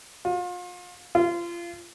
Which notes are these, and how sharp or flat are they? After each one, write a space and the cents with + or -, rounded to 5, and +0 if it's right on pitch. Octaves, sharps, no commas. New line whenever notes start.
F4 +35
F4 -25